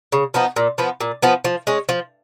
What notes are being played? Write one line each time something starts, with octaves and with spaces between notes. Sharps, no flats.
C#3
F3 B3 D#4
A#2
F3 B3
A#2
F3 B3
F3
G#3 C#4
F3